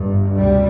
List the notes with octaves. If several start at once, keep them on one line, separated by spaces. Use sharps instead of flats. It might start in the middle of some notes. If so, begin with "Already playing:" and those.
Already playing: G1 G2
D2 C3 G3